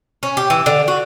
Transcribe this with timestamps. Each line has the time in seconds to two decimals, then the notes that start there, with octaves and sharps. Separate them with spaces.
0.23 C#4
0.37 G4
0.50 E3
0.66 D3
0.88 F#4